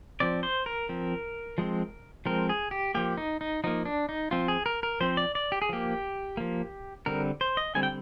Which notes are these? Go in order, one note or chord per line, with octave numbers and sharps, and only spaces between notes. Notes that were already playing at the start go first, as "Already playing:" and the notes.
F3 C4 D5
C5
A#4
F3 C4
F3 G#3 C4
F3 G#3 C4 A#4
G#4
G4
F3 A#3 G4
D#4
D#4
F3 A#3 D#4
D4
D#4
F3 C4 F4
G#4
A#4
A#4
F3 C4 C5
D5
D5
G4
G#4
F3 A#3 G4
F3 A#3
D3 G3 C4 A#4
C5
D#5
D3 G3 C4 G#5
G5